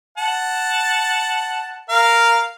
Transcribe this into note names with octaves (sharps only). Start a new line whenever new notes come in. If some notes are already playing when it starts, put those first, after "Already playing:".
F#5 A5
A#4 F5